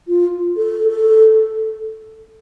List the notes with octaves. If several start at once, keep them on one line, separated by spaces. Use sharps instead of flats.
F4
A4
A4